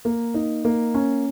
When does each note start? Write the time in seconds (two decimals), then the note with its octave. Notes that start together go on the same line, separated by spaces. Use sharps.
0.05 A#3
0.34 D#4
0.65 A#3
0.95 C#4